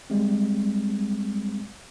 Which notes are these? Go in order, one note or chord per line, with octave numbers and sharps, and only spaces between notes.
G3 G#3 C4